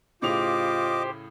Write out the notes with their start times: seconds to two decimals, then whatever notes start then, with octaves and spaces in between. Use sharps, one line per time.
0.22 A2 C#3 F4 G4 C5 D#5 D6 F7